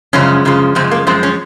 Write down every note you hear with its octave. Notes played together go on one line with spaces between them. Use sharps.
F#2 C#3 F3 G#3 C#4
F#2 C#3 F3 G#3
F#2 C#3 F3 G#3 C4
A#3
F#2 F3 G#3 C4
C#4